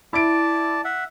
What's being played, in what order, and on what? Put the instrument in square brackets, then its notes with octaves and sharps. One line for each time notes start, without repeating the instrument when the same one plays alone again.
[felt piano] E4 D7 [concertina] D5 A5
[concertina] E5 F#5